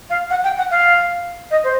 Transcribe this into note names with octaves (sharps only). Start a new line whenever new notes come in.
F5
F#5
G5
F#5
F5
D#5
C5